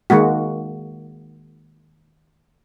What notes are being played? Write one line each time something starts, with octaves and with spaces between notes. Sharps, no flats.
D#3 G#3 A#3 F#4